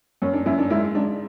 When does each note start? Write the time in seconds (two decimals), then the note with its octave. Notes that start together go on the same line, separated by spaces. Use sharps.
0.22 F#2 C#4
0.33 D4
0.46 F#2 E4
0.58 D4
0.70 G#2 E4
0.95 G#2 D4